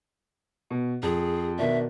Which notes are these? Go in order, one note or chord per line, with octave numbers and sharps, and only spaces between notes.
B2
F2 G#4
B2 D#3 D4 E5